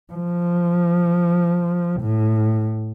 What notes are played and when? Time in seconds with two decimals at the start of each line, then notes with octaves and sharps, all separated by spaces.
0.13 F3
2.01 A2